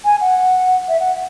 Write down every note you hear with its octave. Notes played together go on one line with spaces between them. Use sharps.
G#5
F#5
E5
F#5